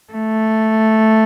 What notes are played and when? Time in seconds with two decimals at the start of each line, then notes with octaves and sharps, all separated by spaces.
0.13 A3